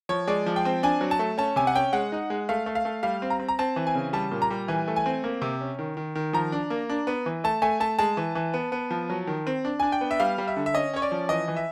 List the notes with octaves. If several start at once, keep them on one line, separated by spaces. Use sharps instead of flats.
F3 C#5
G#3 D5
F3
G5
C4
D4 G#5
F#3
A5
A3
C#4 A5
C3 G#5
F#5
C#4 G5
G#3 F#5
D#4
G#3
A3 F5
A3
F5
A3
G3 F5
C4
A#5
C4
A#5
C4 A5
E3
G#5
C#3
G3 A5
A#2
A#5
G3
E3 G#5
A3
G#5
C4
A#3
C3
C#4
D#3
D#3
D#3
F3 A#5
D4
A#3
D4
B3
E3
A3 A5
A3 G#5
A3 A5
G#3 A5
E3
E3
B3
B3
F3
F#3
D#3
C4
D4
D4 G#5
G5
B3
E5
G3 F5
G3
E5
D3
E5
C#4 D#5
C#4 C#5
D5
F3
E3 D#5
E3
E5